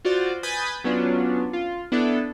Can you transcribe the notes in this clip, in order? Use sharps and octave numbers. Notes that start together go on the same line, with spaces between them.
F4 F#4 C5 D5
B4 G#5 B5 D#6 G6 A6
F#3 B3 C#4 D4 F4
F4
B3 D4 E4 A4